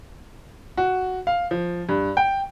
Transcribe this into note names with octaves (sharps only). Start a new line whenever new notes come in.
F#4
F5
F3
G2
G5